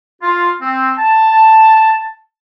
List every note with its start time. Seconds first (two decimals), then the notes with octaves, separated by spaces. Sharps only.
0.21 F4
0.59 C4
0.96 A5